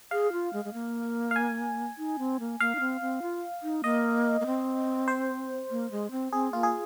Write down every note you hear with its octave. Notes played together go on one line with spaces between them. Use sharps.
G#4 F5
F4
G#3
G#3
A#3
F5
G#5
D#4
C4
A#3
A#3 F5
D#4
C4
C4
F4
D#4
A#3 D#5
A#3
C4
C5
A#3
G#3
C4
C4 G#4
A#3 F4
G#4